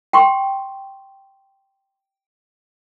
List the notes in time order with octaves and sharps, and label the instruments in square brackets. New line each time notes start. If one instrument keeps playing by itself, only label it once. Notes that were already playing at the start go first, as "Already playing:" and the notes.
[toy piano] G5 C6 C#6